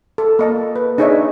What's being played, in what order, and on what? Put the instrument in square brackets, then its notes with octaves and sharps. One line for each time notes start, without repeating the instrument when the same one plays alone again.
[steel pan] A4
A#3 D#5 A5
B4
D4 D#4 G#4 C#5 D#5 E5